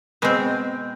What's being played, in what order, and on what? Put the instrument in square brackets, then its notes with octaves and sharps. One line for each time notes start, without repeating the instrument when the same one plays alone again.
[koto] B2 G#3 C4